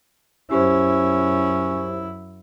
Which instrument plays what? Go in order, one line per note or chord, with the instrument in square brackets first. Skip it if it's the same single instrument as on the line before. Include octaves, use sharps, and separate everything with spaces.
[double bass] F#2 E4 [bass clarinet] C#4 [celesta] G4 C5